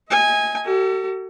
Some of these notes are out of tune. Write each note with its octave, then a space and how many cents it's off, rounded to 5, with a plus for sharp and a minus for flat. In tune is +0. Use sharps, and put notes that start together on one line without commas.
D#5 +35 G#5 -15
F#4 +45 A4 +35